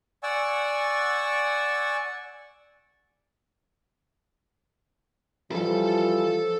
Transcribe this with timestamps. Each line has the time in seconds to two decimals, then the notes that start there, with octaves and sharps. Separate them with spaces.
0.23 D5 F#5 G#5 C#6 E6
5.52 E3 F3 G3 A4 A5